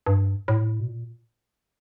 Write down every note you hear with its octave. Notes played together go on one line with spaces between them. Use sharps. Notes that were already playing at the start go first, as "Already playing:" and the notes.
G2
A2
B2
A#2